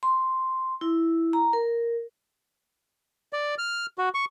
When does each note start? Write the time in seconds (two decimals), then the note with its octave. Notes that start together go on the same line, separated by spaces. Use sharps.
0.03 C6
0.81 E4
1.33 A#5
1.53 A#4
3.33 D5
3.58 F6
3.98 F#4
4.15 C#6